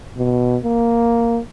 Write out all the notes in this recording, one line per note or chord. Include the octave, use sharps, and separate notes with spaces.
B2
A#3